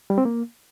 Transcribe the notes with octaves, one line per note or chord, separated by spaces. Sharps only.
G3
C4
A#3